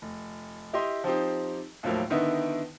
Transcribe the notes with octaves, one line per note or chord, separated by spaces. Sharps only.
F1
E4 G4 D#5 C6
F3 C4 D#4 G4
D#2 A2 F3 F#3 A#3
D3 D#3 B3 D#4 E4